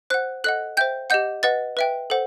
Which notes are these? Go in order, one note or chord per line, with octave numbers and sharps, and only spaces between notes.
C5 F#5 F#6
A4 D#5 F#5 F#6
C5 E5 G5 G6
G4 D#5 F#5 G6
B4 D#5 F#5 A6
B4 E5 G5
A4 C5 F#5